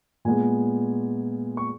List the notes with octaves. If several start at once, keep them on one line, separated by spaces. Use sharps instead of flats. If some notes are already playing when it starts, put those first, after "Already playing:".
A#2 G#3 B3 G#5
C#6